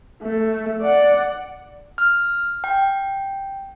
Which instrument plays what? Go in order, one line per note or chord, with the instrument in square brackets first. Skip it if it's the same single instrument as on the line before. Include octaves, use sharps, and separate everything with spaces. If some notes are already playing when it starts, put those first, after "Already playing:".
[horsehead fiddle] A3
D5 F#5
[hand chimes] F6
G5